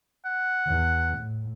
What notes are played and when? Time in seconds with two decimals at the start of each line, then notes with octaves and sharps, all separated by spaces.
0.25 F#5
0.67 E2
1.18 A2